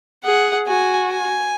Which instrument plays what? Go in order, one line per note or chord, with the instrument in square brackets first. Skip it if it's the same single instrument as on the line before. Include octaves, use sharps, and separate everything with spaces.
[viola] G#4 [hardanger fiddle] F#5
[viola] F#4 [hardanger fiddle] G#5
[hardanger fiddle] G#5